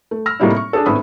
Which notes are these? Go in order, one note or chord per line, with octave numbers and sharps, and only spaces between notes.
A3
E6 F6 A#6
A2 C3 G3 A#3 D#4 E4
C#6
D4 G#4 A4
G#1 A2 B3 B5 D#6 E6